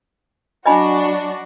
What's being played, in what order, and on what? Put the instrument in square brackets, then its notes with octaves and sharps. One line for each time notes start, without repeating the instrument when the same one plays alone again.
[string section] F#3 D4 F#4 [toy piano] D#5 G#5 B5